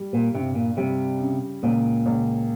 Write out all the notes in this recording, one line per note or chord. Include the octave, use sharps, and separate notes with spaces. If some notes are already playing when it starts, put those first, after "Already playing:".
Already playing: G3
A#2
G2 C3
A#2
C3 G3
C#3
C#2 A#2
C#2